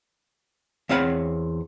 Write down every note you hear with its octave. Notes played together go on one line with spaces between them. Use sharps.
E2 C4 C#5 F5 F#5 B5